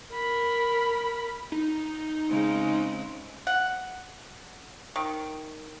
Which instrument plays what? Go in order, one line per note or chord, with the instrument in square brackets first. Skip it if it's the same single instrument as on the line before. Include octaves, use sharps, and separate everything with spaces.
[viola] A#4 B5
[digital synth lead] D#4
[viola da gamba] C#3 G#3 C4
[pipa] F#5
D#3